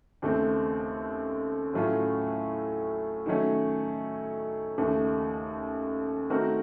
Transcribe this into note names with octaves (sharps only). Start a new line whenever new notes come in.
D#2 C#3 A3 C4
A2 F#3 A3 C#4 F4
D#3 F#3 A3 C#4
D#2 C#3 A3
D#3 A3 C4 F#4 A#4